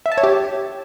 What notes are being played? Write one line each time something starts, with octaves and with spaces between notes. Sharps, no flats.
E5
A5
C#5
G4